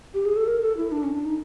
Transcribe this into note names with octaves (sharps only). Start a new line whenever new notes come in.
G4
G#4
A4
A#4
A4
E4
D4
C#4
D4
D#4